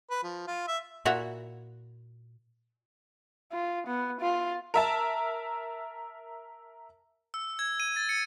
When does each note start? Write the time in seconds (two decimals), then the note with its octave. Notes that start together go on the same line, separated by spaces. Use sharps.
0.11 B4
0.23 F3
0.47 F4
0.68 E5
1.05 A#2 E4 F#4 E5 A#5
3.52 F4
3.87 B3
4.21 F4
4.74 A#4 E5 A5
7.34 E6
7.59 G#6
7.80 D#7
7.96 A6
8.09 C#7